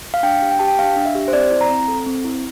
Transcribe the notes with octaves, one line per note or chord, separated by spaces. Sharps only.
F5
D4 G5
G4
G5
G4 A5
G5
D4 F5
D4
E5
G4
C5
C4 D5
E4
A#5
C4
A4
C4
E4